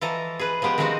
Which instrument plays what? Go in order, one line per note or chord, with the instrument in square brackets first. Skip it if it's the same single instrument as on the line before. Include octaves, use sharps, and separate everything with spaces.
[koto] E3 F3 A4 D#5 A#5
G#4 B4
F3 G#3 B3 G4
D#3 F3 G#3 C4 D#4 F#4